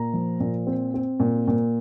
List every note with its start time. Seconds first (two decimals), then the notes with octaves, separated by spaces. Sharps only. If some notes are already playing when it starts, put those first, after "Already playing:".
Already playing: A#2 A#5
0.13 F3
0.40 A#2
0.67 C4
0.94 C4
1.20 A#2
1.48 A#2